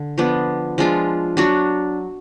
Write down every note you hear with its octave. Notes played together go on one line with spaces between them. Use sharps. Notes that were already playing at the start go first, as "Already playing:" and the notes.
Already playing: D3
F3 B3 D4
F3 G#3 D4 F4
F#3 D4 F#4